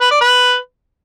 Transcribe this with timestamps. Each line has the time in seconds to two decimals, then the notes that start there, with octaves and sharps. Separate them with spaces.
0.01 B4
0.11 D5
0.21 B4